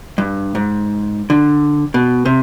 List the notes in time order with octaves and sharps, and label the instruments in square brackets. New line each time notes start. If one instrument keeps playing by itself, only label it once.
[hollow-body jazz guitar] G2
G#2
D3
B2
C3